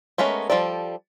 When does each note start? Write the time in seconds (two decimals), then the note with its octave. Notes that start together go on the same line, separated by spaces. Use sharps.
0.18 G#3 A3 B3 C#4 A#4
0.50 F3 G3 A4 D5